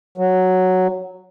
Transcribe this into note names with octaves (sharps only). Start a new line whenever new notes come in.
F#3